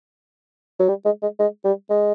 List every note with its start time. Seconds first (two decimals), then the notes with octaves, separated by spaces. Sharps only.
0.79 F#3
0.88 G3
1.05 G#3
1.22 G#3
1.39 G#3
1.65 G3
1.90 G#3